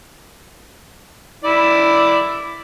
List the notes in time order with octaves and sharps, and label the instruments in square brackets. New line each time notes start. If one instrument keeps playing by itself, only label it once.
[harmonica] E4 D5